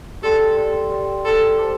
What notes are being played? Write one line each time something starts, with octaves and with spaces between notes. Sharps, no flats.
G4 A4 D5 G5 C6
G4 D5 G5 C6
G4 D5 G5 C6
G4 A4 D5 G5 C6
G4 C5 A5 D6